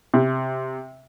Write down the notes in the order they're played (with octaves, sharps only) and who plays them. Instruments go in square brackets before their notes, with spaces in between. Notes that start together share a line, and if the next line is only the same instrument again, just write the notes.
[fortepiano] C3